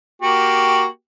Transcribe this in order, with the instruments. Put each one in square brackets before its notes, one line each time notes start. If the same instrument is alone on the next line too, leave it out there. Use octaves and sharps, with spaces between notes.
[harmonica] A#3 F#4 G4